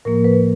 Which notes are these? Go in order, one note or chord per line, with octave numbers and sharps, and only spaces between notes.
A2 F3 A#3 A#4
B4